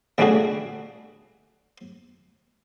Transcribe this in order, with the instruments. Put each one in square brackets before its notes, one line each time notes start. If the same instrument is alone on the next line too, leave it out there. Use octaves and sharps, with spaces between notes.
[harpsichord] C#3 G3 A3 D4 F#4 G#4